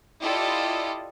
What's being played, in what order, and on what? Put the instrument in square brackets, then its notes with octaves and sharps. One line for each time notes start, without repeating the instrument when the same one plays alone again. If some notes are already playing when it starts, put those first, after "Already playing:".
[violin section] E4 F4 G4 A4 D5 D#5